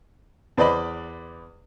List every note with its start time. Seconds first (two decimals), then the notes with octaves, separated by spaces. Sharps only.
0.57 E2 B4 C5 D5 D#5 B5